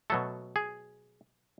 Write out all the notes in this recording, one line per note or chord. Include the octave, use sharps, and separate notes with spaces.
B2 F#3 A3 A4
G#4